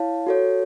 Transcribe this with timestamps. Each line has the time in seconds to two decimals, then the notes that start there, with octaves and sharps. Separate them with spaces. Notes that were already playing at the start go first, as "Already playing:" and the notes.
Already playing: E4 C#5 F5 A5
0.27 F#4 A4 C#5